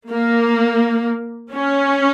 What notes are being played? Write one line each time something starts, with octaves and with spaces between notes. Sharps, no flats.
A#3
C#4